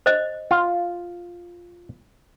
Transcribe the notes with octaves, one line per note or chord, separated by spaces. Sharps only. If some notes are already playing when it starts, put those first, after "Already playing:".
C5 D#5
F4